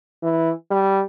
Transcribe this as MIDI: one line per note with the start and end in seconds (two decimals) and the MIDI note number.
0.22 0.51 52
0.71 1.03 55